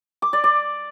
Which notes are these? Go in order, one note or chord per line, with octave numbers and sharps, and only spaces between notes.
D6
D5
D5